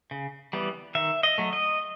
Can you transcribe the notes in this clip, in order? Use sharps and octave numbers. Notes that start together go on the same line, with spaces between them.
C#3
E3 G3 B3
D#3 E5
D#5
F#3 A3
D#5